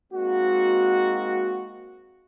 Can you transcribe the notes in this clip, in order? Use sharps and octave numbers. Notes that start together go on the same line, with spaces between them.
G#3 A#3 C4 D#4 F#4